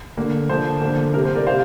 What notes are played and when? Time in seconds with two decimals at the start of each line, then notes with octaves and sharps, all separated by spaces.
0.17 D3 A#3
0.49 D3 F3 A#3 C5
0.82 D3 A#3
1.14 C3 G3 A#3 A#4
1.25 C5
1.35 A#4 D5
1.47 C3 G3 C5 F5